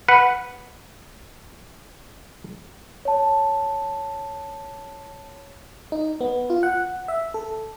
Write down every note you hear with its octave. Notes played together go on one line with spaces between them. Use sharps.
B4 F#5
C#5 A5
D#4
B3
F4
F#5
E5
A4